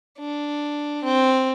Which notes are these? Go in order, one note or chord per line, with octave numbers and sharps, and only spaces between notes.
D4
C4